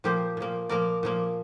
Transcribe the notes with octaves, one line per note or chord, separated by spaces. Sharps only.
A#2 F3 A#3 G4 C5
A#2 F3 A#3
A#2 F3 A#3 A#4 D5
A#2 F3 A#3